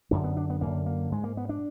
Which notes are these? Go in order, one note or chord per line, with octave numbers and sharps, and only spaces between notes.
F#2 D3 D4
B3
D4
B3
F#2 D3 A#3
A#3
G#2 G#3
A#3
B3
D4